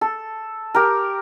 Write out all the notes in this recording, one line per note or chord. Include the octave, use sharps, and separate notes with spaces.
A4
G4 A#4